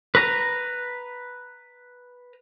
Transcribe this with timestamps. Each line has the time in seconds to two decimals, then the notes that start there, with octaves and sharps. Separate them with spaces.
0.15 B4 A#5